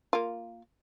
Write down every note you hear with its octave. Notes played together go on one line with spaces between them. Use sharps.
A#3 F4